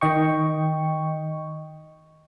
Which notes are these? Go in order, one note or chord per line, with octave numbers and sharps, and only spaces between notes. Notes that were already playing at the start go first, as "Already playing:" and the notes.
D#3 D#5 G5 C#6